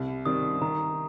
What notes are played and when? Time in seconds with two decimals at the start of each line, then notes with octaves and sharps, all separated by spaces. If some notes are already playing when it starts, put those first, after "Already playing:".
Already playing: C2
0.26 C3 D#3 G3 C4 D#6
0.61 D#3 A#5